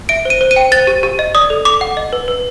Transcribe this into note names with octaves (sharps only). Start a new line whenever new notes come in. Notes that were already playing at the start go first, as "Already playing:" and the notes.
E5 D7
C5 D#7
C5
D#7
G5
C5 A6
G4
G4
D#5
D5 D#6
A4
A4 D6
F#5
D#5
B4
B4